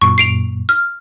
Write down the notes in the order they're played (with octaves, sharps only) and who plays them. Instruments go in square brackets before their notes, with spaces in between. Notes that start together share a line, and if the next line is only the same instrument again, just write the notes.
[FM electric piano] F#2 A#2 [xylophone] C#6
[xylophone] C7 D7 F7
F6